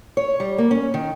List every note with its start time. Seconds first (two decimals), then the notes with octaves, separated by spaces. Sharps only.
0.17 C#5
0.40 G3
0.58 A#3
0.71 C#4
0.94 D#3